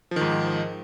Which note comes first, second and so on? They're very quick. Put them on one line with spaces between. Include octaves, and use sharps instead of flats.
F3 D#3 G#2